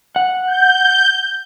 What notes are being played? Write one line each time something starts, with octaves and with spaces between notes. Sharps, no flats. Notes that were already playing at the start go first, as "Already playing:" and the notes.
F#5
G6